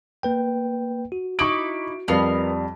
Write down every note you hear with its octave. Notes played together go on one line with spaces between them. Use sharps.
A#3 B4 G5
F#4
D#4 E4 C#6 D6 D7
F2 G3 B3 A#4 F5